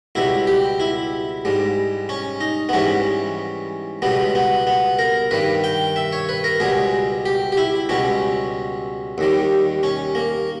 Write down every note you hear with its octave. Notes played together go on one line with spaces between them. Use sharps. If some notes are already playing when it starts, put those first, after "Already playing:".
C#2 B2 G3 E4
G4
E4
G#2 G3
C#4
D#4
B3
G#2 E3 G3 C#4
C#2 B2 G3 B3
B3
B3
A#4
G2 D#3 G3 B4
G5
E5
C#5
B4
A#4
C#2 B2 G3 G#4
G4
G4
E4
C#2 B2 G3 C#4
D#2 D#3 G3
C#4
A#3